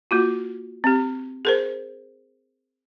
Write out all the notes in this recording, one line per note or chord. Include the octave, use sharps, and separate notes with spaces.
A#3 F4 F#4
C4 G4
G#4 A#4 C5